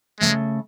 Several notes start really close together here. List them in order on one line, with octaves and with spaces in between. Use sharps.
E3 G#3 A3 C#3